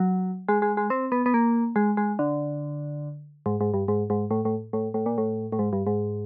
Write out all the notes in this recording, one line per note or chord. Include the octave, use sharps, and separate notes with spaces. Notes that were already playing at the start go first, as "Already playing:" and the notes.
Already playing: F#3
G#3
G#3
G#3
C4
B3
B3
A#3
G#3
G#3
D3
G#2
G#2
G2
G#2
G#2
A2
A2
A2
A2
A#2
A2
A2
G#2
G2
G#2